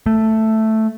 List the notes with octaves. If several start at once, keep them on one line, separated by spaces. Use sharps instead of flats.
A3